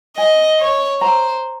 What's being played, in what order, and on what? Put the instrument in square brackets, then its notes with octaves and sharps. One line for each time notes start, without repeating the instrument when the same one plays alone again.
[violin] D#5 [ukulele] G#5
[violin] C#5
[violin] C5 [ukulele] A#5